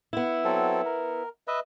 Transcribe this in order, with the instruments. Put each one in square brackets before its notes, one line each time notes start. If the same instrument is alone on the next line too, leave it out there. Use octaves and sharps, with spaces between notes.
[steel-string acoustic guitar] B3 E4
[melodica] F#3 C4 A4
A#4
B4 D#5 E5